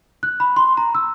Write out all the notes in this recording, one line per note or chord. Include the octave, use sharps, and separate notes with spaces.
F#6
B5
C6
A#5
E6